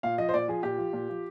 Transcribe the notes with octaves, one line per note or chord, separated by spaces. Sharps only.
A#2 F5
F3 D#5
C5
A#2 D5
F3 G#4
A#2 G4
F3
A#2
F3